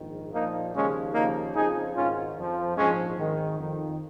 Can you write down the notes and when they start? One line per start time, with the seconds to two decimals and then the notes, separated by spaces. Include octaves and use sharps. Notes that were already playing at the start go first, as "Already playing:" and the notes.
Already playing: A#1 G#2 D#3
0.32 A#1 A#2 F3 A#3 D#4
0.74 D#2 C#3 F3 G#3 C#4
1.14 D#2 C#3 F3 A#3 D#4
1.55 F2 C#3 F3 D#4 G#4
1.95 G#1 G#2 D#3 C#4 F4
2.36 F2 F3
2.76 A#1 G#2 F3 G#3 C#4
3.18 G#1 G#2 D#3
3.57 F2 D#3